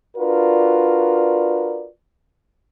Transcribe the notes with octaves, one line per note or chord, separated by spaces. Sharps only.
D4 F4 F#4 A#4 B4 D5